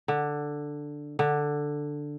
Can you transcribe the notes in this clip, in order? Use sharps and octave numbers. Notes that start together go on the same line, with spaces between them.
D3
D3